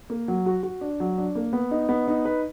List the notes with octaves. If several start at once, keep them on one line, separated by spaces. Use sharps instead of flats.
A#3
F#3
F#4
F#4
D4
F#3
D4
A#3
B3
D#4
B3
D#4
B4